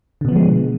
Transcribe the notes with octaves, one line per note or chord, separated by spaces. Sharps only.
B2 D3 F3 G#3 B3